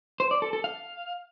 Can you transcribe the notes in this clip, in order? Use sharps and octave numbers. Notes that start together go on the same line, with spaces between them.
C5
D5
A4
A4
F5